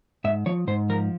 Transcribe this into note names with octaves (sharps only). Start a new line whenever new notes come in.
G#2 E5
F3 C#5
G#2 C5
F3 A#4